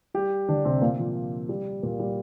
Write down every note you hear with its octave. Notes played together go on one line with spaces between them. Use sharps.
G3 G4
D3 D4
C3 C4
A#2 A#3
F3
G3
A#2 A#3
G3